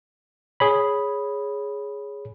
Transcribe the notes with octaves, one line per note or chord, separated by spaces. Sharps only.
G#4 C#5 B5